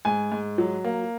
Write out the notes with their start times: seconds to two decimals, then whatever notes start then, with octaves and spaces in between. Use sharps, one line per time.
0.05 G#2 G#5
0.32 G#2
0.58 F#3
0.84 A#3